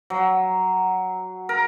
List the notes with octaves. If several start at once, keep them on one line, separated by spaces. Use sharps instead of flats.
F#3
A#4